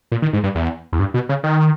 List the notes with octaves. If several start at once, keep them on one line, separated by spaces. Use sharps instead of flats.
A#2
D#3
G#2
G2
E2
E2
G2
B2
C#3
D#3